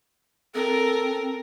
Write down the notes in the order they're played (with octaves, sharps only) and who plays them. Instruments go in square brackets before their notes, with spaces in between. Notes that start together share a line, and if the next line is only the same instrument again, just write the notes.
[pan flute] C4 [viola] A4 A#4